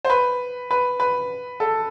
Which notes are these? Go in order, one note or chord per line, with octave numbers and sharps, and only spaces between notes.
C5
B4
B4
B4
A4